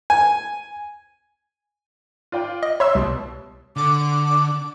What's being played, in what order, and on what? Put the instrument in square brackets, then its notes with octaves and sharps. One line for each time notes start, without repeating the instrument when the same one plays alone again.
[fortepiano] G#5
[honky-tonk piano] F4 D5 G5
[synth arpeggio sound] D#5
[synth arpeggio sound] C#5 E5 E6 [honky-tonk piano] C6
[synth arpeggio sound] C2 [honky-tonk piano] B2 G3
[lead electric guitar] D3 [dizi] D6